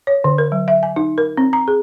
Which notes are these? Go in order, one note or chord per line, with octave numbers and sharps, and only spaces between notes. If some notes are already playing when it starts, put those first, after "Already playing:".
C#5
D3
A#4
F#3
E5
G#5
D#4
A#4
C4
A#5
G#4